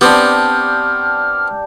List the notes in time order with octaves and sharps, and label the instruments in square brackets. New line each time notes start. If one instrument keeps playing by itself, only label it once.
[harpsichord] B3 C4 [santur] D4 G4 [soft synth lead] F6